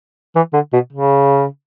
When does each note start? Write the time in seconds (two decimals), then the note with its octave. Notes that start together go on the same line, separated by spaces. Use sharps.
0.35 E3
0.53 D3
0.73 B2
0.93 C#3